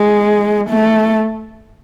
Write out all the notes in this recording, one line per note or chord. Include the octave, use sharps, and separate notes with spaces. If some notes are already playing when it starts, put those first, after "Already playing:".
Already playing: G#3
A3